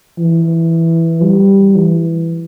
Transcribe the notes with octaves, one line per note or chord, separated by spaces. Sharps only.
E3
G3
E3